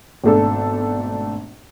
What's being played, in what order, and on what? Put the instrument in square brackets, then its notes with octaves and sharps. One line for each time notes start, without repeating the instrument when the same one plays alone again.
[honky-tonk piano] G#1 B2 A3 D4 A4